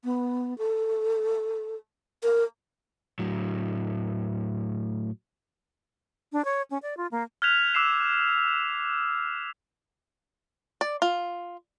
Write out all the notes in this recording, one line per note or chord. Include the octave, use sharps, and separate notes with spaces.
B3
A4
A#4
A2 F#3
D4
C#5
C#4
D5
F4
A#3
F6 F#6 G#6 B6 F7
D6 E6 F#6 C7 E7
D5
F4